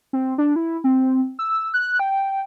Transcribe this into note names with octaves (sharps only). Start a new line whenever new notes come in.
C4
D4
E4
C4
E6
F#6
G5